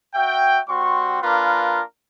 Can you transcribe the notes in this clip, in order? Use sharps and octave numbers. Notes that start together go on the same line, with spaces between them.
F#4 E5 G5
G3 C4 F#4 C6 C#6
A#3 D4 F4 A#4 B4